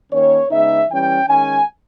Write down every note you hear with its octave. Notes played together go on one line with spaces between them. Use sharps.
D#3 A#3 C#4 C#5
C#3 G#3 B3 D#4 E5
E3 G3 C#4 G5
D#3 G#3 C#4 G#5